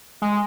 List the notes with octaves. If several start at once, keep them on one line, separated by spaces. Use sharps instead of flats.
G#3